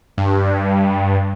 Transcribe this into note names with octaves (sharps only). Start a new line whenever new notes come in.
G2